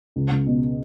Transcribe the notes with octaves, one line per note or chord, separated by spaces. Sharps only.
C#2
C#2
B2